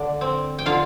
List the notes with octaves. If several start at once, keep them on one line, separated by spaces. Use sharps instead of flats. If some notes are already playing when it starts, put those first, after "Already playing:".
Already playing: D3 D4 D5
C4
G5
D3 F4 F5